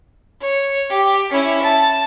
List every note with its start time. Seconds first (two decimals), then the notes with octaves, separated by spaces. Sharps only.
0.41 C#5
0.89 G4
1.29 C#4 E4
1.63 A5